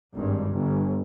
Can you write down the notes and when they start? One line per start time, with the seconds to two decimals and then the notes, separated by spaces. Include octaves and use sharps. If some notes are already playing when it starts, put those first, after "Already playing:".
0.14 G#1 G2
0.53 G1